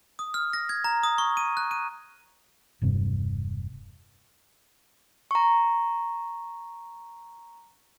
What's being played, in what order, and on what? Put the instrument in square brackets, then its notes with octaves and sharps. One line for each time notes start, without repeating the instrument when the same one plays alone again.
[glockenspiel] D#6
F6
A#6
G#6
A#5
D#6
C#6
D#7
F#6
D#7
[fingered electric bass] E1 G2 C3
[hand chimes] A#5 C#6